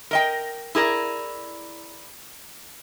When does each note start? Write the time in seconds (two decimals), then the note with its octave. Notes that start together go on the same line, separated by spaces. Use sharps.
0.11 A#4 D#5 G5
0.75 E4 G#4 A#4 D5